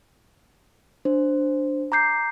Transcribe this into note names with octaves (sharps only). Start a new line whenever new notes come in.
D4 C5
A#5 D6 G6 C7